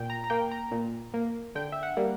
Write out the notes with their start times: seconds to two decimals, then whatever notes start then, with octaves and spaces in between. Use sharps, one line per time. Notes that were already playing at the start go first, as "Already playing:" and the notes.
Already playing: A#2 G5
0.10 A#5
0.24 A#5
0.30 A#3 G5
0.51 A#5
0.71 A#2
1.14 A#3
1.55 D3 G5
1.72 E5
1.83 F#5
1.97 G3 A#3